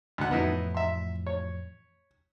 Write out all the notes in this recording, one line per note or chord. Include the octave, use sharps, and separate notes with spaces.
D2 F#5
F2 A2 E3 B3 D#4 E4
E5 C6
C#5